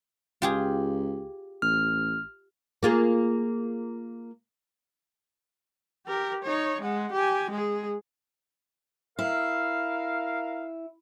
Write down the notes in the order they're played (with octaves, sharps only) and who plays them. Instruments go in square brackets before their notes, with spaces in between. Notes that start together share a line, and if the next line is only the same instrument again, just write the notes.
[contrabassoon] C#2 [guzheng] F4 G4 G#4
[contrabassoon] A1 [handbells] F6
[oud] A#3 F4 G#4
[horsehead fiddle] G4 A#4
D#4 C#5
G#3 F#5
G4 G#5
G#3 G#4
[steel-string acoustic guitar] E4 [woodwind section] A#4 F5